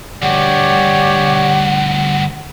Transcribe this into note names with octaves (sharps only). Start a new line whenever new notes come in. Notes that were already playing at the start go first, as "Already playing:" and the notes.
D2 G2 G4 C#5 D5 F#5